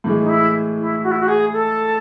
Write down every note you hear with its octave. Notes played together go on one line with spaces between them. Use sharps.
A2 E3 G#3
D#4
E4
E4
F#4
E4
F#4
G#4
A4